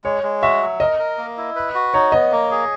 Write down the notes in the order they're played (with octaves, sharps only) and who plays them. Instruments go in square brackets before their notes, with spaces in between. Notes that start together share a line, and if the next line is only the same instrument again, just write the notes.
[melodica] G#3 [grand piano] C#5
[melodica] G#3
[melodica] F#4 [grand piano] E5
[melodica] F#3
[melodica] A#4 [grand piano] D#5
[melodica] A#4
A#3
E4
B4
F#4
[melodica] D#4 [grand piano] C#5
[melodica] B3 [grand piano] D#5
[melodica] A#3
G#4